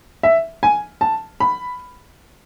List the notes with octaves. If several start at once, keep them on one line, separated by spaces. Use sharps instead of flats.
E5
G#5
A5
B5